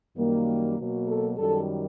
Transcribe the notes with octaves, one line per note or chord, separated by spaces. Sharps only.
F#2 D#3 G3 A#3
B2 F#3 A#3
A4
F#2 D#3 G3 A4